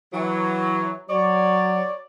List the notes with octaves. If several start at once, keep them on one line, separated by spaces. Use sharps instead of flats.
E3 F#3
F#3 C#5 D5